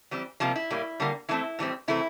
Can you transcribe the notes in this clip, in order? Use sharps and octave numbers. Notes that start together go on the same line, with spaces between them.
E3 G3 C4
C3 F3 G3 A#3 F4
E4
A2 G3 A#3
D3 G3 A#3
E3 A3 C4 E4
A2 E3 G3 C4
C3 E3 A3 C4 E4